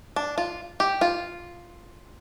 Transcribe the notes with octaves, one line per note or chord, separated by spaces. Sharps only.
D4
F4
G4
F4